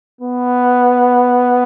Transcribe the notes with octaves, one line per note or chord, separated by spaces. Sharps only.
B3